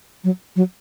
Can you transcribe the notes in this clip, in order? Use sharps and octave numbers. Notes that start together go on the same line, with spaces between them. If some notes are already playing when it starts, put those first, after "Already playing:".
F#3
F#3